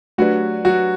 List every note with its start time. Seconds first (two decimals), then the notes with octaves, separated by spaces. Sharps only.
0.18 F#3 A3 D4 F#4 G4 B4 D5
0.65 F#3 F#4